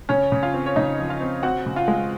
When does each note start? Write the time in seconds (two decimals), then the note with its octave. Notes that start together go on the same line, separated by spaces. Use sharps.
0.09 C#3 C#4 C#5
0.32 C#3
0.43 F4 F5
0.54 C4
0.66 C#5
0.76 C#3 D#4 D#5
0.99 F3
1.09 F4 F5
1.21 C4
1.43 C4 F#4 F#5
1.66 C#3
1.76 F4 F5
1.88 G#3